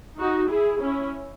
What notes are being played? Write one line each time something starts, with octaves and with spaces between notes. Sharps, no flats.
D#4 F#4
E4 G#4
C#4 E4